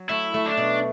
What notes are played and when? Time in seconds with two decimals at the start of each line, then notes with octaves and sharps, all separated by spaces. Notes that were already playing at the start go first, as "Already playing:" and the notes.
Already playing: F#3
0.09 A3 E4
0.34 A3
0.46 D4
0.57 B2